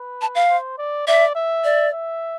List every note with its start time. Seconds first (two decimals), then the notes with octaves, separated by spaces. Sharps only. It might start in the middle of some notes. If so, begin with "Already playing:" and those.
Already playing: B4
0.21 A5
0.35 F5
0.49 C5
0.78 D5
1.07 D5 E5
1.35 E5
1.64 D5
1.93 E5